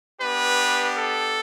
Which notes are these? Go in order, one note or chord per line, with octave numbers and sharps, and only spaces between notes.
B3 D4 G4 B4
A4